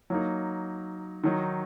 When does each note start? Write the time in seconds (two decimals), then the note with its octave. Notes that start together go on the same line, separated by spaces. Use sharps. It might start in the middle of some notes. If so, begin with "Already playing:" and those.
0.10 F#3 A#3 D#4
1.24 D#3 F#3 D#4